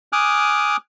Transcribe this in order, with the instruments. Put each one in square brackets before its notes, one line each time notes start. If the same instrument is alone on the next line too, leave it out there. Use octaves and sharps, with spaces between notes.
[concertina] G#5 D6 D#6 F6 F#6